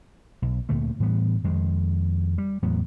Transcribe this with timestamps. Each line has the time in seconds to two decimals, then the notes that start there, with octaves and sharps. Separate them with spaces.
0.42 B1
0.69 D2 A#2 D3 A3
1.00 A2 E3 G3 B3
1.44 F2 D#3 G#3
2.38 G3
2.62 E2 A2 F#3 B3